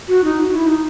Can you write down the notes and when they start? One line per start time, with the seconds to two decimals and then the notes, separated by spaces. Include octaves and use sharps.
0.08 F#4
0.24 D#4
0.40 F#4
0.55 E4
0.66 D#4